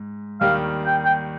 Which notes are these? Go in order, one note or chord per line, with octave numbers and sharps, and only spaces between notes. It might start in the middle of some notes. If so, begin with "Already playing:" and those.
Already playing: G#2
D#2 D#3 G3 F5
G5
G5